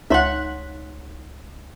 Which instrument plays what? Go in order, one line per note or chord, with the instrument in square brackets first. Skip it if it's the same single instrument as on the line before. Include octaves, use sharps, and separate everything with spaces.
[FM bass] C#2 [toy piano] D#4 C#5 C6 [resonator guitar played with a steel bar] E5 F#5